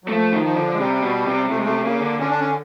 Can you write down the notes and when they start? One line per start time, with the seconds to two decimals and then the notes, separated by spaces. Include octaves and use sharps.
0.04 F#3
0.09 F3 A3
0.32 D#3
0.44 F3
0.56 D3
0.74 G#3
0.79 C3 G3
1.02 B2
1.26 C3
1.50 C3 A3
1.58 G#3
1.64 C3 A3
1.78 C3
1.84 C#3 A#3
2.02 D3
2.19 D3 C#4
2.30 D4
2.40 C#4